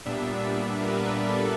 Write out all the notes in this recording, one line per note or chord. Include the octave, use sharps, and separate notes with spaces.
A#2 G3 B3 D4 E5
A#4
B4
B4
A#4
A4